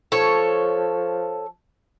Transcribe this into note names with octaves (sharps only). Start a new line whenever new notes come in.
F3 A4 C#5